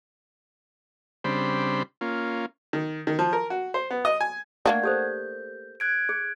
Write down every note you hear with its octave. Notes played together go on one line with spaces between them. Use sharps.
C#3 G3 C4 D4 C5 B5
A#3 C#4 F4
D#3
D#3
F3
A#4
F#4
C5
B3
D#5
G#5
A3 A#3 D4 F#5 G#6
G4 A4 C5 G6
F#6 G#6 D7
G#4